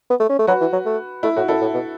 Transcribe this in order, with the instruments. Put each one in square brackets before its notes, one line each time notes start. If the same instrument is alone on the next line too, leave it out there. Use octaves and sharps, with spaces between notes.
[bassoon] B3
A3
C#4
A3
[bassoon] F#3 [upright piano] F#4 B4
[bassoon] E3
F#3
A3
[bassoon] A3 [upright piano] E4
[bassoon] A2 [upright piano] F#4
[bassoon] F#2 [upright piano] E4 A4
[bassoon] A2
B2